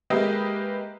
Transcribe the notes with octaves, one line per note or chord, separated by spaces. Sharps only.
G#3 A#3 G4 B4 D#5 E5